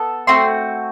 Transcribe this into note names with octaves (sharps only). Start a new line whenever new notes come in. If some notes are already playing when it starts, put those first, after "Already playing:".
Already playing: B3 A4
A3 C4 F#4 C6